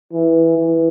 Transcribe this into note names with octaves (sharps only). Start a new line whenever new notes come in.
E3
E3